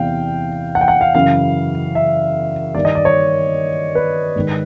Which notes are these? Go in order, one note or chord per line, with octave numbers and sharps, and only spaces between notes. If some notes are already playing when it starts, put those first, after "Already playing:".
Already playing: E2 C3 E3 F5 G5
F#5
G5
F#5
F5
F#2 C#3 E3 F5
E5
G2 D#3 D5
D#5
D5
C#5
B4
G#2 D#3